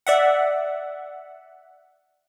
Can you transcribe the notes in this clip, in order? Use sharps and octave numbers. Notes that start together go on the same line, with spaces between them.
D5 E5 F#5